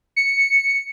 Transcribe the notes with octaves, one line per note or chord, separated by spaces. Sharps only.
C#7